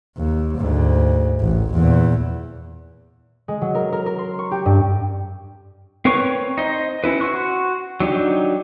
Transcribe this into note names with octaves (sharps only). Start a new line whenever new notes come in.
D#2
D2 G#2
A1
E2 A#2
G#3
F#3
A#4
A#4
A#4
C6
C#6
G4
G2
C4 A#4 B4 C#5 C#6
D#4 C5 D#5
C#4 E4 B4
F#4 C6 C#6 F#6
F#3 D4 D#4 G4